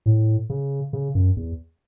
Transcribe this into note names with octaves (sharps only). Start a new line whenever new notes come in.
A2
C#3
C#3
F#2
E2